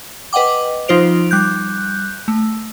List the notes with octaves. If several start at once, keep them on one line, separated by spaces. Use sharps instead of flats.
B4 D#5 F#5 G5 D6
F3 D#4 F4 C5 D7 F7
G3 F#6 G6
A3